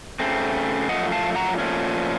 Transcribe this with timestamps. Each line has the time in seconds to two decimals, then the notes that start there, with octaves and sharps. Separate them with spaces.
0.20 C#3 A3 C4
0.89 F#2 F3 A3 D#5 F#5
1.12 F5 A5
1.36 F#5 A#5
1.59 A#2 F3 A3 C#4